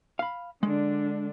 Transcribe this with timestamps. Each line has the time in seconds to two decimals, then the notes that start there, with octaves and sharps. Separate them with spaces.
0.19 F5 B5
0.63 D3 G#3 D4